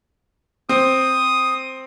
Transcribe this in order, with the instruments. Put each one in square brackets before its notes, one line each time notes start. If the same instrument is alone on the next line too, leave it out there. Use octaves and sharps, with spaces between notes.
[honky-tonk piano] C4 [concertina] D#6